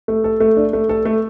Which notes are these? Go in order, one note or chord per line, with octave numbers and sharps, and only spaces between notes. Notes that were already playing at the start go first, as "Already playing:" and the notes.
A3
A4
A3
D4
A3
A4
A3